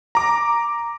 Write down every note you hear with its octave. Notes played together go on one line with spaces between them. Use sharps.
A#5 D6